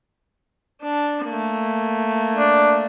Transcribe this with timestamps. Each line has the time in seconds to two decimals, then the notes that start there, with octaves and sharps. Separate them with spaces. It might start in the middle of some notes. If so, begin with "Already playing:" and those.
0.82 D4
1.26 A3 A#3
2.35 D4